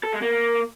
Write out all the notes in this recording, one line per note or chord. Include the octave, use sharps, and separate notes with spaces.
A4
G#3
A#3